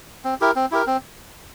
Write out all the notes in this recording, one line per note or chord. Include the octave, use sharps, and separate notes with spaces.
C4
E4 G4 A#4
C4
E4 G4 A#4
C4